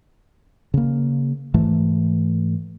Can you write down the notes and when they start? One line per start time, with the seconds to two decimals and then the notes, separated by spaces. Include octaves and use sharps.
0.74 C#3 A#3
1.54 G#2 E3 A3